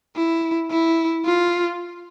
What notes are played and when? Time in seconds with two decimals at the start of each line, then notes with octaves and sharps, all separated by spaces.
0.16 E4
0.70 E4
1.25 F4